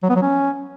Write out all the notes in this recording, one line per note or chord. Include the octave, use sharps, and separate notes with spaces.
F#3
B3
F#3
C#4